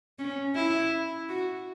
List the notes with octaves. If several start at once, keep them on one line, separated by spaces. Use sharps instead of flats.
C#4
E4
F#4